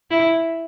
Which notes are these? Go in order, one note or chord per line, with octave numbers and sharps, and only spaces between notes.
E4